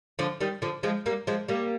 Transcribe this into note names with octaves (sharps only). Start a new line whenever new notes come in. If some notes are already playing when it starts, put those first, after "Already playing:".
D3 F3
D#3 G3
D3 F3
F3 G#3
G3 A#3
F3 G#3
G3 A#3